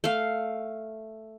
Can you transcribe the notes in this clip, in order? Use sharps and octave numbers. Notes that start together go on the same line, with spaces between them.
A3 F5